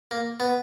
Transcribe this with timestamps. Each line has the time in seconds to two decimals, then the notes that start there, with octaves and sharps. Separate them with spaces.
0.11 A#3
0.40 B3